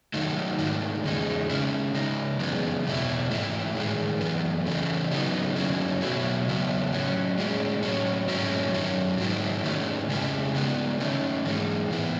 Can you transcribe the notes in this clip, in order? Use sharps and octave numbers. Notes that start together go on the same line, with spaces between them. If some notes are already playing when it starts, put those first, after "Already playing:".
D#3 F#3 A3 D#4
G#2 D#3 A3
E2 C#3 G#3 D#4
C#3 G#3 C#4 E4
C#3 G#3 D#4
F#2 C#3 E3 G#3 B3
E2 B2 A3 E4
G#2 E3 A3 E4
A2 E3 G#3
F#2 E3 B3
C#3 E3 A3
C#3 F#3 B3 D#4
F#2 D#3 F#3 C#4 E4
B2 F#3 A3 E4
E2 C#3 F#3 B3 E4
A2 F#3 C#4
A2 G#3 C#4 E4
A2 F#3 C#4
G#2 F#3 C#4 E4
F#2 D#3 F#3 C#4
G#2 D#3 F#3 A3 E4
G#2 D#3 A3 C#4
C#3 G#3 C#4 E4
C#3 G#3 B3
D#3 A3 C#4
G#2 E3 G#3 D#4
A2 E3 B3 E4